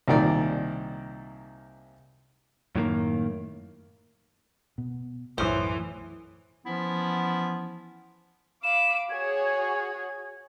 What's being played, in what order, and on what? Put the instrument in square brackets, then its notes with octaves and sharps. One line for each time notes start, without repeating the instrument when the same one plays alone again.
[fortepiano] C2 A#2 D#3 D5
[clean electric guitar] F#2 A2 D#3 G#3 A#3
[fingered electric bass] B2
[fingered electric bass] B1 F#2 [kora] A2 B3 [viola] E3 [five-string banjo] C5
[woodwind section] E3 F3 B3 C#4 E4
[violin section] F5 B5 D6 [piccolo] E7
[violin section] F#4 G#4 C#5 [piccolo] G#6